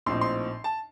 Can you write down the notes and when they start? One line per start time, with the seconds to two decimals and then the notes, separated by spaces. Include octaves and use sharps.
0.06 A#1 A2 F3 C4 D#4 C6
0.21 C6
0.64 A5